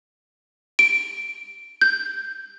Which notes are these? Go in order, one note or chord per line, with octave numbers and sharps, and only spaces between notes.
D7
G6